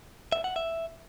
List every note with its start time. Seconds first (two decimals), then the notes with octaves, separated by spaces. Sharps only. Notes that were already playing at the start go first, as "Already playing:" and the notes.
0.32 E5
0.44 F#5
0.56 E5